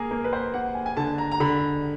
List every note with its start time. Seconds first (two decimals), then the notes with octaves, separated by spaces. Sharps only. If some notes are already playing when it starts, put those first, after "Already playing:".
Already playing: A#3 G#4 A#4
0.11 A#3
0.24 B4
0.33 C5
0.54 A#3 F#5
0.75 G#5
0.86 G#5
0.97 D3 A5
1.18 A#5
1.32 A#5
1.40 D3 B5